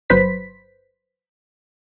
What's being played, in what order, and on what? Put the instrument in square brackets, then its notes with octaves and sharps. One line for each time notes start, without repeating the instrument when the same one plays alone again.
[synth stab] G1 F#3 B4 C5 B6